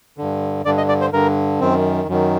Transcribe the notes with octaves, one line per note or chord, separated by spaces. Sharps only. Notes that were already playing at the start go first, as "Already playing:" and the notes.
G2 D3
G2 D3 D5
D#5
D5
C5
G2 D3 A#4
F#2 D#3 C4
F#2 D#3